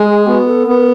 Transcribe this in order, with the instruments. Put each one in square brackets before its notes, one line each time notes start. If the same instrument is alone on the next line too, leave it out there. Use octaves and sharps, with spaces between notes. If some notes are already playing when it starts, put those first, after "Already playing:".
Already playing: [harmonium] G#3 [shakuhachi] G#4
[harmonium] B3 [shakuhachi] F#4
[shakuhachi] A4
[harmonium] B3 [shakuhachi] A#4